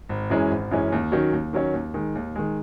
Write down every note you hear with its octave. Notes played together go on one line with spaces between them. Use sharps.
G#1
F#2 E3 G#3 C#4
G#1
F#2 E3 G#3 C#4
D#2
D#3 F#3 C#4
D#2
D#3 F#3 C#4
D#2
D#3 G#3
D#2
D#3 G#3